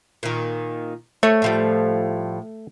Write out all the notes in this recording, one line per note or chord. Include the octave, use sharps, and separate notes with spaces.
A#2 D#3
A3 C#5
A2 F3 G3